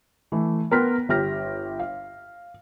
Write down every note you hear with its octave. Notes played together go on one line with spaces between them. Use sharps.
E3 A3
B3 A#4 G5 C6 F6 B6
G1 G4 G5 F6 A#6
F5